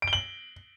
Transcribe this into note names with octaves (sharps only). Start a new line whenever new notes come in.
D7
G7
F#7